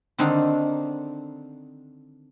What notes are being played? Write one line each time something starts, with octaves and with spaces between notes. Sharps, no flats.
D3 D#3 C4 D4 D#4